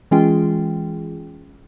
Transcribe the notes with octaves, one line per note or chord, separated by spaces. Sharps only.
E3 G#3 C#4 F4 G#4 G5